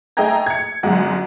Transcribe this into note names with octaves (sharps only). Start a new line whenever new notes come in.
A3 G#4 D#5 G5 A#5 G#6
G#6 C#7
G1 F#2 G#3 F#5